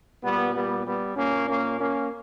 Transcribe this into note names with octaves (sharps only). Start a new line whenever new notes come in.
A#2 G3 B3
G3 B3
G3 B3
A#2 A#3 C#4
A#3 C#4
A#3 C#4